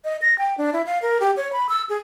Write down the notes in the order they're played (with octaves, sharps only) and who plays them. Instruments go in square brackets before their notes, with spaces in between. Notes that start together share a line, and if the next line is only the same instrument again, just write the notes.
[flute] D#5
A#6
G5
D4
E4
F5
A#4
G4
C#5
B5
E6
G#4